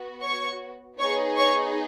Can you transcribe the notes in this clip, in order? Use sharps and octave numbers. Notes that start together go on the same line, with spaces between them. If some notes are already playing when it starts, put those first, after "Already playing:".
Already playing: B3 F#4
C#5 C#6
B3 D#4 G#4 C#5 C#6
C#5 C#6